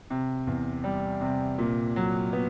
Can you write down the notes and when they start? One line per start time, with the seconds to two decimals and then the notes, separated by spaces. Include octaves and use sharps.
0.10 C3
0.47 E2
0.84 G3
1.21 C3
1.58 A#2
1.96 F#3
2.33 B3